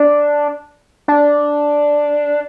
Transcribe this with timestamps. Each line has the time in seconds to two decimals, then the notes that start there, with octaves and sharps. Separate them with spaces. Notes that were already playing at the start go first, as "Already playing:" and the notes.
Already playing: D4
1.08 D4